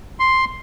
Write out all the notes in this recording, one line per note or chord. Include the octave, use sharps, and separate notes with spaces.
C6